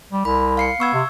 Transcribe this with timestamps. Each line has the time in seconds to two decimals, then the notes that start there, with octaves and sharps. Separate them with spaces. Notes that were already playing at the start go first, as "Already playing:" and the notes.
0.12 G3
0.25 C2 B5
0.57 F5 C7 C#7
0.80 B3 C#6 E6 G#6
0.94 C3